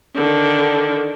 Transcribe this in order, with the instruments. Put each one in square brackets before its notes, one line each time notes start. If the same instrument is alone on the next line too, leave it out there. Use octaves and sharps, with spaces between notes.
[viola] D3 D#3